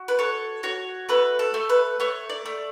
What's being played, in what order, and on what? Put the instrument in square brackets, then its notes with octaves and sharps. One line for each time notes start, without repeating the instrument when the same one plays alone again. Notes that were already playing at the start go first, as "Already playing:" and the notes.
Already playing: [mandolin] F#4
B4
A4 C#5
F#4 C#5
A3 B4
A4
A3
B4
A3 C#5
D5
A3